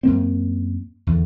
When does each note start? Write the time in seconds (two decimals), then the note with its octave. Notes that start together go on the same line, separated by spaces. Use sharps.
0.03 F#2 A#3 C4
1.07 E2 D3